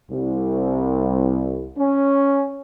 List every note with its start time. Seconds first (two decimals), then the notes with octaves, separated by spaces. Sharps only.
0.11 C2
1.77 C#4